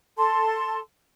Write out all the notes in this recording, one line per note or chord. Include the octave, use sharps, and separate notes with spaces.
A4 A5 C6